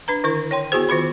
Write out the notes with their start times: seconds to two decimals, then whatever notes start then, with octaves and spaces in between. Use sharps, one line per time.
0.08 D4 B4 A#5
0.24 D3 D#3 E4 A#4 C#6
0.51 C#5 G5 C6
0.72 B3 E4 F#4 G#4 C5
0.89 D#3 F4 C5 B5